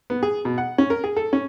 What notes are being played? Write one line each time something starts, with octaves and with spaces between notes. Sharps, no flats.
B3
G#4
B2
F#5
C#4
A#4
G#4
A4
C#4